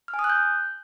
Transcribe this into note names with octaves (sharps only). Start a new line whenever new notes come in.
F6
G#5
D#6
F#6
G6